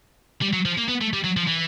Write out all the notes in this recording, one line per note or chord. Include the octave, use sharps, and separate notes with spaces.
G3
F#3
F3
A#3
B3
A3
G3
F#3
F3
E3